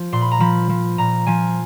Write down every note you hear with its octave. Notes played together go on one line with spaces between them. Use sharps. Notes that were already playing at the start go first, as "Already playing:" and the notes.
Already playing: F3
A#2 C6
B5
A#5
F3 B5
F3
A#2 A#5
F3 G#5